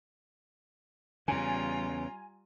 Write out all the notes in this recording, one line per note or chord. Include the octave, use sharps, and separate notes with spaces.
E2 C#3 G3 F4 G#5 A#5